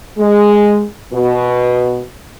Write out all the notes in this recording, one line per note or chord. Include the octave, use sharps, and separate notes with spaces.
G#3
B2